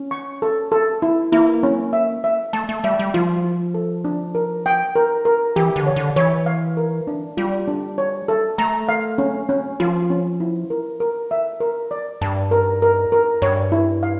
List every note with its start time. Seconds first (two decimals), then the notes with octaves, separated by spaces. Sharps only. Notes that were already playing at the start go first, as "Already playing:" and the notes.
Already playing: C#4
0.11 C#6
0.42 A4
0.72 A4
1.02 E4
1.32 A#3 E4
1.63 C#4
1.93 E5
2.24 E5
2.53 A3 A5
2.69 A3
2.84 G3 E5
2.99 G3
3.14 F3 F4
3.44 F4
3.74 A4
4.05 D4
4.35 A#4
4.66 G5
4.95 A#4
5.25 A#4
5.56 E3 G4
5.76 D3
5.86 C#5
5.96 D3
6.16 E3 C#5
6.46 F5
6.77 A#4
7.07 D4
7.37 G3 F4
7.68 D4
7.98 C#5
8.28 A4
8.58 A3 A#5
8.89 F5
9.18 C#4
9.49 C#4
9.80 F3 F4
10.10 C#4
10.40 E4
10.70 A#4
11.00 A#4
11.31 E5
11.60 A#4
11.91 D5
12.21 G2 A5
12.51 A#4
12.82 A#4
13.12 A#4
13.42 G2 C#5
13.72 E4
14.03 F5